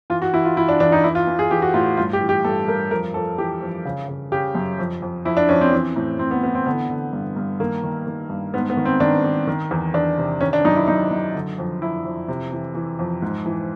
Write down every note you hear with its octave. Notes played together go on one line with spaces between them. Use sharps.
E3 F4
F#4
E3 E4
F4
E3 E4
D4
E2 D4
D#4
E3 E4
F4
E3
G#4
E3 G4
F#4
A2 F4
G2 F4
G4
E3
G4
G2 A4
G2 A#4
F2 A#4
F2 A4
E3 G4
F2
C#3
C#3
C#3 G4
F#2
F2
F2
F2 E4
D4
F2 C#4
C4
E3
A2
A2 C4
B3
E3 B3
C4
D3 B3
D3
G2
G2
D#3 A#3
D#3
D#3
G2
G#2 B3
B3
D#3
C4
D#3 D4
D#3
D#3
E2
E2 D4
C3
D#3 C#4
D4
F#2 D#4
E4
F#2 D#4
F#2
D3
F2
F2 E4
F2
C3
E3
E3
F2
G#2
E3